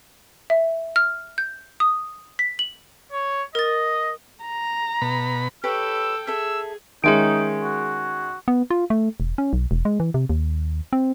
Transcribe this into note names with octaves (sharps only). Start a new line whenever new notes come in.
E5
F6
G6
D#6
B6
F#7
C#5
A#4 D#5 A6
A#5
B2 B5
G4 A4 B4 C#5 G5 E6
G#4 A4 E5 E6
D#3 G#3 C#4 D#4 G#4 E5 D7
F#4
B3
F4
A3
E1
C#4
B1
E1
G#3
E3
C3
D#2
C4